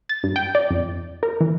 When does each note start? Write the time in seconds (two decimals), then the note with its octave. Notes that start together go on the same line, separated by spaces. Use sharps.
0.09 A6
0.23 G2
0.36 G5
0.55 D5
0.71 F2
1.23 A#4
1.41 E3